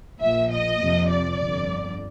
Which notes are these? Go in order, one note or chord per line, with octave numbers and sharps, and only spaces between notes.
A#1 A#2 F3 E5
D#5
F2 C3 F3
D5
G1 F2 D3